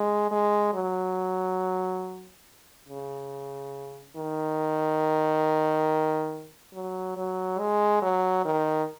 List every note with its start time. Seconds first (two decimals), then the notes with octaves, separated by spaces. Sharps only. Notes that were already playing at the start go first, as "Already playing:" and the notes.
Already playing: G#3
0.32 G#3
0.74 F#3
2.89 C#3
4.17 D#3
6.74 F#3
7.17 F#3
7.59 G#3
8.02 F#3
8.45 D#3